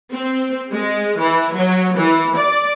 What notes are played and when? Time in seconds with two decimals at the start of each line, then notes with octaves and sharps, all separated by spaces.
0.13 C4
0.72 G#3
1.18 E3
1.54 F#3
1.95 E3
2.37 D5